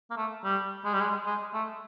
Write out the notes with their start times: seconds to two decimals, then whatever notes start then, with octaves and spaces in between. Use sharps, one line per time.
0.11 A#3
0.17 A3
0.44 G3
0.85 G#3
0.93 G3
1.01 G#3
1.26 G#3
1.54 A3